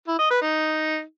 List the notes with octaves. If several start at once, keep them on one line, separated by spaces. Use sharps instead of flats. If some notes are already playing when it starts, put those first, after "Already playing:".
E4
D#5
B4
D#4